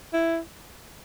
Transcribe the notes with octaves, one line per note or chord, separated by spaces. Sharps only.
E4